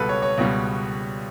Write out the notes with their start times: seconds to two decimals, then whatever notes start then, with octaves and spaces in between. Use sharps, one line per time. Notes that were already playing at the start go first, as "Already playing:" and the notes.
Already playing: C#2 B2 G3 A4 B4
0.09 C#5
0.22 C#5
0.38 C#2 B2 G3